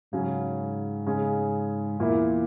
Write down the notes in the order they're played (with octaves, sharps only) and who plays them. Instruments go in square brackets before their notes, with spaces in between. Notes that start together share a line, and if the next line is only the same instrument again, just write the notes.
[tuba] G#2 [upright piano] C#3 F#3 C#4
[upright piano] C#3 G#3 C#4 G#4
[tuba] E2 [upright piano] A#2 A#3 E4